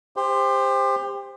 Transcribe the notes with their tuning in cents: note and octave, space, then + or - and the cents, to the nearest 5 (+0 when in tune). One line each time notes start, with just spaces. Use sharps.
G4 +30 C5 +0